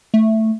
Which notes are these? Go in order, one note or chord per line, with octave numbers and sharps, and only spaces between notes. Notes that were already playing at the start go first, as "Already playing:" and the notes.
A3